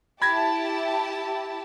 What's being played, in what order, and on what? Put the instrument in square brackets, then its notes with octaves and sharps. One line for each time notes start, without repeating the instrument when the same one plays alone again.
[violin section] E4 G4 A5 [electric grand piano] B5 G#6 A#6